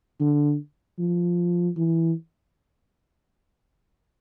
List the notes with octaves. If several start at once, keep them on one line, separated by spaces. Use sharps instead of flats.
D3
F3
E3